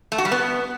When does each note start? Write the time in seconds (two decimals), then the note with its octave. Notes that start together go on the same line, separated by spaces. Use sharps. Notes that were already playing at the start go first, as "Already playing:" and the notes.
0.12 A3
0.18 F#4
0.25 G3
0.32 B3